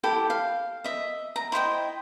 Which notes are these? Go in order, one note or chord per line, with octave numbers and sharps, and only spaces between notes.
E4 G4 A4 G5
F5
D#5 E5
A#5
E4 C5 D#5 G5